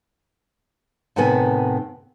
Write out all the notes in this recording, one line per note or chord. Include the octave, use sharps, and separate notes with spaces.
A2 C3 D#3 B3 G#5